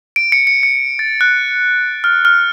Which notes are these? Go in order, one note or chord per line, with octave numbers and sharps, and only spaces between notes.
D7
C#7
C#7
C#7
A6
F#6
F6
F6